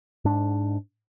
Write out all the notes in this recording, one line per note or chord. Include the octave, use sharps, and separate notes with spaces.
G#2 D4